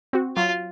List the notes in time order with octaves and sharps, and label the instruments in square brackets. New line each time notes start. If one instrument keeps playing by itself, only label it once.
[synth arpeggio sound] C4 F#4
[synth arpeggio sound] F#3 [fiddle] F4